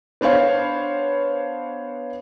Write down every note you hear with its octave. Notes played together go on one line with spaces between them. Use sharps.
B3 D4 C5 C#5 F5